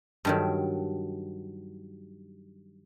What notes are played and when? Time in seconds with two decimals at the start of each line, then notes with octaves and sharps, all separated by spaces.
0.25 G2 D#3 F#3